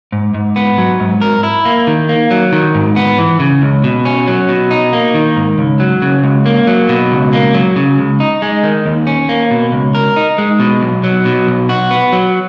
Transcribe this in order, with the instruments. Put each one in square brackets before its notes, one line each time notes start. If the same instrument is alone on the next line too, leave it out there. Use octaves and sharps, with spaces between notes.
[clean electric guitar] G#2
G#2
B3
F#3
G#2
A#4
E4
A#3
D#3
A#3
F#3
D#3
G#2
B3
E3
C#3
C#2
B2
C#4
F#3
B2
D#4
A#3
D#3
G#2
C#2
F#3
C#3
C#2
A#3
F#3
B2
C#2
A#3
F#3
C#3
C#2
D#4
G#3
D#3
D#2
C#4
A#3
B2
C#2
A#4
D#4
G#3
B2
B1
F#3
B2
B1
F#4
B3
F#3